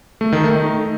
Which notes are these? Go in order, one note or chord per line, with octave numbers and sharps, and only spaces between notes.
A3
D#3
A3
D#4